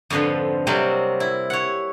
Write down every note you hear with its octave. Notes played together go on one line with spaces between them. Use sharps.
F2 G#2 D3 F3 B4
C3 F#3 G3 A#3 C4
E4
C#5 F#5